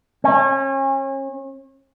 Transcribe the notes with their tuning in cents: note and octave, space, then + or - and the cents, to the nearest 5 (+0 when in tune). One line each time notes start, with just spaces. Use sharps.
C#4 -35